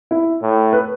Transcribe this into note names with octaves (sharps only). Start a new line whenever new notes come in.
E4
A2
B4